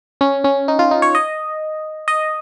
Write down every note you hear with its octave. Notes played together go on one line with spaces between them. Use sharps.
C#4
C#4
D#4
F4
D#4
C#5
D#5
D#5